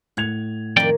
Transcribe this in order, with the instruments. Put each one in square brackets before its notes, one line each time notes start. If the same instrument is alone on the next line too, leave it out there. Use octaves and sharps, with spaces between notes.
[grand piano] A2 G#6 F7 [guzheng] F#5
[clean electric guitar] F2 D5 G5 [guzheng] D#3 A#3